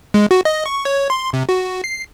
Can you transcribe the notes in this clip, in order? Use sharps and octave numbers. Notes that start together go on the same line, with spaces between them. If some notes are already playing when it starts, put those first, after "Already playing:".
G#3
F#4
D#5
C#6
C#5
C6
C3
F#4
C7